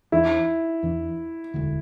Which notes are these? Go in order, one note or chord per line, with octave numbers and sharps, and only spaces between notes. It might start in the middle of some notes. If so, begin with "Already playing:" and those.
E2 E3 D4 E4
E2 E3 D4
E1 D2 D3